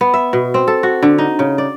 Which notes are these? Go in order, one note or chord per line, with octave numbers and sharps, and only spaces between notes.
B3
E5
B2
C4
A4
F#4
D3
D#4
C#3
D5